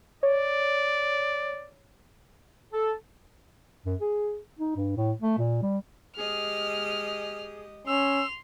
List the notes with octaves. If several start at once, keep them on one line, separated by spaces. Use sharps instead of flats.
C#5 D5
A4
F#2
G#4
D#4
G2
A2
A3
A#2
G3
G#3 G4 G#4 D#5 F6
C#4 C6 E6 F7